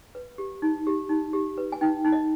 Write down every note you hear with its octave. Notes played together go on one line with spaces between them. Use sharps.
B4
G4
D#4
G4
D#4
G4
B4
G#5
D#4 G5
D#4
D#5